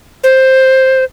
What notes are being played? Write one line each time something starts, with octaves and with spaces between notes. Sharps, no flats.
C5